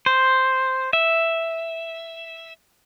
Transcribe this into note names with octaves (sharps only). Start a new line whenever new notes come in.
C5
E5